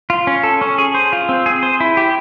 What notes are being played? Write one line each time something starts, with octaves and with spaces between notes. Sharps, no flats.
F4
C#4
A4
C#4
G#4
C5
F4
C4
G#4
C5
E4
G4